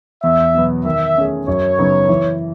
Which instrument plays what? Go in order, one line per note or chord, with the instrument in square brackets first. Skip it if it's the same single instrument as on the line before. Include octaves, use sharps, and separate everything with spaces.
[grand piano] E2 [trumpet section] E5
[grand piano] B2 F#3 B3
[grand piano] D#3 [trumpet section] E5
[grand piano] A3 C#4 G#4 C#5
[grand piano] F#2 [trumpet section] C#5
[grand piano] C#3 F#3 B3 D#4
E3